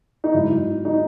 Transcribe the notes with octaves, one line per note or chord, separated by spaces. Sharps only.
D#4
G#2 F#3 E4
D#4